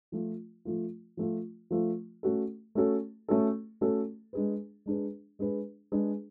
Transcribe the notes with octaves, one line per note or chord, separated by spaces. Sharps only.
F3 A3 F4
F3 A3 F4
F3 A3 F4
F3 A3 F4
A3 C#4 F#4 A4
A3 C#4 F#4 A4
A3 C#4 F#4 A4
A3 C#4 F#4 A4
G#3 D4 G#4 B4
G#3 D4 G#4 B4
G#3 D4 G#4 B4
G#3 D4 G#4 B4